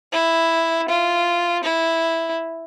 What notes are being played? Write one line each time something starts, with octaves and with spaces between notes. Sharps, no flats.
E4
F4
E4